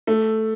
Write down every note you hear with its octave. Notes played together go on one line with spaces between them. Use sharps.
A3